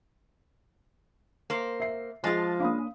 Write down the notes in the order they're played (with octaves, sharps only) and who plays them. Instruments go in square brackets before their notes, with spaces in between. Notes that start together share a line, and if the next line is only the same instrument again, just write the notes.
[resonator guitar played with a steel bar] A#3 C5
[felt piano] E5 C7
[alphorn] F3 [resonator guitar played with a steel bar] G#3 F4 [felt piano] G#4 D#5 C6 [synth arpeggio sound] A5 A6
[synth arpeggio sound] A#3 C#4 D4 [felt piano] F5 B5 D#6